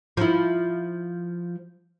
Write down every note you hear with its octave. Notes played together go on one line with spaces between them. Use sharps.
F3 E4